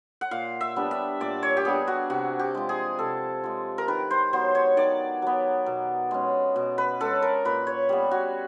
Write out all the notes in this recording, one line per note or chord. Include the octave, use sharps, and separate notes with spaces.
F#5
A#2 F5
E5
G3 B3 D4
E5
A#2 D5
C#5
G4
G3 B3 D4 G#4
F#4
C3 F#4
G4
F3 G#3
G#4
C3 A4
F3 G#3
A#4
D#3 B4
C5
F#3 B3 C5
C#5
D#3 D5
F#3 B3
B2
G#3 C#4
B2
B4
G#3 C#4 A4
A#4
A#2 B4
C#5
G3 B3
F#4